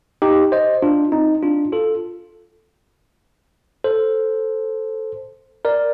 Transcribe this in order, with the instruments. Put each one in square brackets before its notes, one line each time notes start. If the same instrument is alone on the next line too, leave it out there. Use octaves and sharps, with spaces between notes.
[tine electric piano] D#4 G4
C5 D#5
D4 F4
C4 D#4
D4 F4
F4 A4
A4 C5
A#4 D5